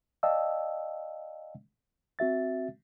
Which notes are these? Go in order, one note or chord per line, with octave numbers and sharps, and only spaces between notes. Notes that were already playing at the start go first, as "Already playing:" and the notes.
D5 D#5 F5 G5 A5 E6
C4 F#4 E5 A6